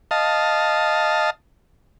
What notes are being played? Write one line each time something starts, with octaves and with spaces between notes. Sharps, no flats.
D#5 F5 A5